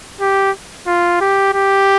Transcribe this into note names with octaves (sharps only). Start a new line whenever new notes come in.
G4
F4
G4
G4